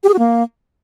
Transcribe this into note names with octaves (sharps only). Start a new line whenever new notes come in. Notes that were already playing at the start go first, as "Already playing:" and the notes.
G4
G#4
F#4
A#3